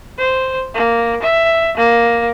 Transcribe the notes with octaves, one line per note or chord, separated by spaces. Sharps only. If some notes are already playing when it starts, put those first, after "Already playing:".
C5
A#3
E5
A#3